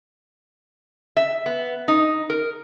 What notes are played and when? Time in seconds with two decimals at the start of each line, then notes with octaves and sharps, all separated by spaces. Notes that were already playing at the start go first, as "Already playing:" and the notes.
1.17 E5
1.46 B3
1.88 D#4
2.30 A#4